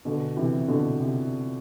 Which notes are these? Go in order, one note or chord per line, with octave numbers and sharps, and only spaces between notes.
B2 D3
C3 E3
B2 D3
C3